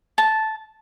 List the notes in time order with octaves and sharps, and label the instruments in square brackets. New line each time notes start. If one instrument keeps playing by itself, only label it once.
[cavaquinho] A5